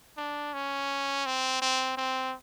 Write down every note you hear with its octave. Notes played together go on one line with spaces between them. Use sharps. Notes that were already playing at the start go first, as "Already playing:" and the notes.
D4
C#4
C4
C4
C4